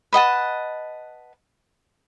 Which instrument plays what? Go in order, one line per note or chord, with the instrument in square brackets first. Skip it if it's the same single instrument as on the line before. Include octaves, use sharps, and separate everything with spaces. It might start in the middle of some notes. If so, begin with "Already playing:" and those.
[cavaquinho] B4 D#5 F#5 A5